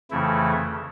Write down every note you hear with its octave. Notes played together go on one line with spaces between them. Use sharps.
F2 C#3 E3 A3 E4